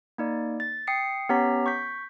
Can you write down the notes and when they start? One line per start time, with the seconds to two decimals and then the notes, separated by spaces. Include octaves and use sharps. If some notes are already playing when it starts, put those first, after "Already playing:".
0.18 A#3 D#4 D5
0.60 A6
0.87 G5 D#6 C7 C#7
1.29 B3 C#4 G4 C#5 A#5 B6
1.66 C#6 G6 B6